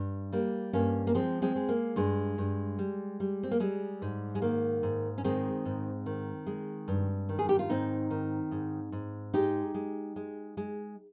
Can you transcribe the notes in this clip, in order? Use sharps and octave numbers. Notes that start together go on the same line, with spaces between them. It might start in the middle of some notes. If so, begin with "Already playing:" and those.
Already playing: G2
G3 A#3
G2 A#3 C#4
A#3
F3 G#3 C4
G#3 C4
G#3
A#3
G2 G#3
G2
G3
G3
C4
A#3
G3 G#3
G#2
G#3
D#3 A#3
G#2
C#4
D#3 G#3 C4
G#2
D#3
G#3
G2
D#3
G#4
G4
F4
G#2 C4 D#4
D#3
G#2
G#2
G#3 D#4 G4
G#3
G#3
G#3